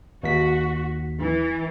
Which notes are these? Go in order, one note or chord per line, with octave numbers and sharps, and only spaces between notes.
D#2 F#4 B6
E3